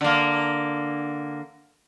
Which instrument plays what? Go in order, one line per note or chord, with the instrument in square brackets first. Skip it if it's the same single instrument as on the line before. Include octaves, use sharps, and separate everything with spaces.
[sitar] D3 A#3